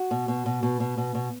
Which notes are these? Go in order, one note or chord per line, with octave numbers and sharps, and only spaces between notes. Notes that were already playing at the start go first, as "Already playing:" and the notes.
Already playing: F#4
B2
B2
B2
B2
B2
B2
B2